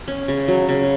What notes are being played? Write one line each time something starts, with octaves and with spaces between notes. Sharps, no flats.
C#4
C#3
F#3
C#3